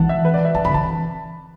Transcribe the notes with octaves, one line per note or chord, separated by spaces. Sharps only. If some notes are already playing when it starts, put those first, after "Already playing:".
Already playing: E3 F#5 A5
E5
B4
D5
E5
E3 A5
D3 B5
E3 A5